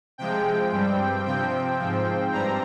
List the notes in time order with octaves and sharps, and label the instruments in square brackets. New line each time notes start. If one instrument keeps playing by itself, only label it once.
[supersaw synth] C3 F3 G#3 G5
G2 G3 C4
C3 F3 C4 G5
G#2 F3 C4
G2 G3 C4 A#5